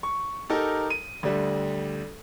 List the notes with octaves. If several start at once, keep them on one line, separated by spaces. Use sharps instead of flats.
C#6
D#4 G4 A4 A#4
D#7
D2 D3 G3